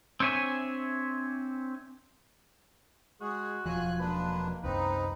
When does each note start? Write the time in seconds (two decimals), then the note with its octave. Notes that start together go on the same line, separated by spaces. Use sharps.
0.20 C4 D4 C#5 E5 G#5
3.21 G#3 F#4 G#4
3.66 E1 F3 F#3 F4 G#5 F#6
3.99 G#3 A#3 D4 B4
4.63 C2 F#2 C4 D#4 B4